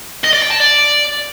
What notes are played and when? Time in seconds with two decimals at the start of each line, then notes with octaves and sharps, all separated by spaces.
0.24 D#5
0.33 D5
0.42 G5
0.51 A5
0.60 D5